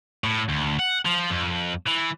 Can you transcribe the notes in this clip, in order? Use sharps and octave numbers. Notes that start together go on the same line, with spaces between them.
A2
D2
F#5
F3
F2
E3